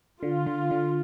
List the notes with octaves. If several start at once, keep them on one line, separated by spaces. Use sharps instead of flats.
D3 F4
D3
D3